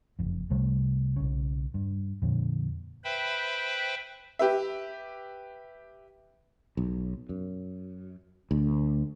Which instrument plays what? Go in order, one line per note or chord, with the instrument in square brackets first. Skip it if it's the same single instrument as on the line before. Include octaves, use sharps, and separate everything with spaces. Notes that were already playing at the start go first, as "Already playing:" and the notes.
[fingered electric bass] F#1 F2
C2 C3 G3 A3
B1 C#3
G2
F2 A#2 D3
[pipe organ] B4 C5 E5 G5 B5
[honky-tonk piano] G4 B4 E5
[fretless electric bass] B1
F#2
D2